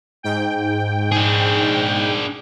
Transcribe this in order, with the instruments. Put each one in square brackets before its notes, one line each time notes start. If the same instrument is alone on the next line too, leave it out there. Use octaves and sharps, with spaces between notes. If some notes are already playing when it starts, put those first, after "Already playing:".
[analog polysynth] G#2 G5
[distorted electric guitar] D4 G#4